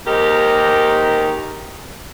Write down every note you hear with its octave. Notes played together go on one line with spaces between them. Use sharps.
D#2 G#2 D#4 G4 A#4